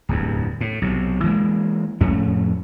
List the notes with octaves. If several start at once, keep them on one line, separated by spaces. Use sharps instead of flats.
D1 E2 G2
A2
B1 C3
E3 G#3 A#3
F2 A2 A3 C#4